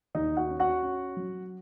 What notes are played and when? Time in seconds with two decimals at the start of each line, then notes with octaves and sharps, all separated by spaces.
0.15 D#2 D#4 D#5
0.37 F#4 F#5
0.49 C#4
0.60 F#4 F#5
0.83 C#4
1.17 F#3